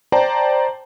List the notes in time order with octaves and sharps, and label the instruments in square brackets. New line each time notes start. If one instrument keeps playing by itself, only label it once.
[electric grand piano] C5 D5 G5 A5 A#5